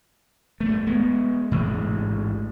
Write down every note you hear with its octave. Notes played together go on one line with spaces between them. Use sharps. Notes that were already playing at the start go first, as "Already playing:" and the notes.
G2 A3
G#3 B3
A1 D2 G#2